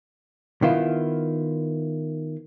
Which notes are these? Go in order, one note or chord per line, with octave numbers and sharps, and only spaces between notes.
D#3 B3 E4 F4